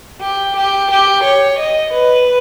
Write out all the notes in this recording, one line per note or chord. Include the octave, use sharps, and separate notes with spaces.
G4
G4
G4
C#5
D#5
B4